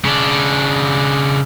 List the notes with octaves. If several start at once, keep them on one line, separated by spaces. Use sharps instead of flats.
C#3 D4